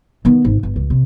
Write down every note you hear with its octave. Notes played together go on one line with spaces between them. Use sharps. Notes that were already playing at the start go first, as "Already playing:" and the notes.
D#3 B3
G#1
G1
C#2
C3